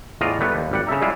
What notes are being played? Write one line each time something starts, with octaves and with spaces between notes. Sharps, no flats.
E2 A2 F4 D5 D#5 A#5
G3 A3 B3
D#2
G#1 G3 F#5
C#3 A4 E5 A#5
G3 G#3 E4 F4